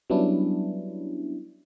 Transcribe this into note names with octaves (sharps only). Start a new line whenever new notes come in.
F#3 G3 B3 C#4 D4 E4